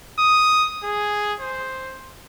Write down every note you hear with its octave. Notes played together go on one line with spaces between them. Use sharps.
D#6
G#4
C5